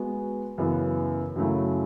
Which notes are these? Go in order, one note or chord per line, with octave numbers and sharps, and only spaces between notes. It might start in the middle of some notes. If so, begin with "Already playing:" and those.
Already playing: G#3 B3 F#4
F#2 C#3 E3 B3
F#2 C#3 F#3 A3 E4